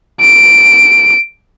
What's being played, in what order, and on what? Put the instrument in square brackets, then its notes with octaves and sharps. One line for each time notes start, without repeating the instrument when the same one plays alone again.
[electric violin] D7